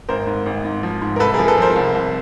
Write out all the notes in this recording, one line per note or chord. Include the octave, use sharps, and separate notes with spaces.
G#1 A#4 C5
G#2
G#1
G#2
F3
G#2
A#4
C2 A4 B4
F3 G#4 A#4
A4 B4
F3 A#4 C5
C2
C2